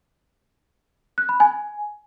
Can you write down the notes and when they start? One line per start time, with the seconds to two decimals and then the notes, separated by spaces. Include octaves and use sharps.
1.18 F#6
1.29 B5
1.40 G#5